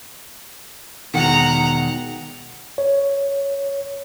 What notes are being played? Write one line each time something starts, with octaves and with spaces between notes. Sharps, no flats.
E1 B2 D#3 F#5 A#5
C#5